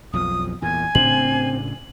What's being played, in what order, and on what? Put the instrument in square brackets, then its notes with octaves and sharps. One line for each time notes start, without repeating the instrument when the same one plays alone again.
[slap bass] B1 F2 F3 [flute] D#6
[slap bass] E2 A#2 [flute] G#5
[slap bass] A2 C#3 D4 [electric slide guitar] C4 [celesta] F#7